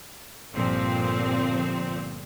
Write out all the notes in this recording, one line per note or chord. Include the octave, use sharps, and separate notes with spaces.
G1 A#2 F3 C4